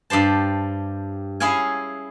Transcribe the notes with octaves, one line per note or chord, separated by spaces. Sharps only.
G2 G4 C5 A5
C#4 E4 G#4 C#5 F5 G#5